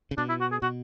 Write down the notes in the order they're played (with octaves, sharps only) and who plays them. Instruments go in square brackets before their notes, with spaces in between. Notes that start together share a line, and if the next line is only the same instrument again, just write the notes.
[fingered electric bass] C#3
[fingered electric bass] B2 [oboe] D4
[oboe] E4
F#4
G#4
[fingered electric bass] B2 [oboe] F#4